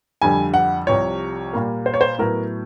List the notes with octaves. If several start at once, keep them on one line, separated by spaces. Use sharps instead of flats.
F2 D3 G3 G#5
F#5
C2 C3 F3 C#5
A#2 G3 A#3
C5
C#5
C5
A2 F#3 B3 A#4